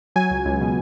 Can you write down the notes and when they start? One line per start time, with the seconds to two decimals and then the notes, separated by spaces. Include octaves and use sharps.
0.16 F#3 G#5
0.30 C#2
0.45 C#2
0.61 B2